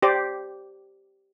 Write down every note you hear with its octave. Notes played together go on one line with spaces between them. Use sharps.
G4 C5 D5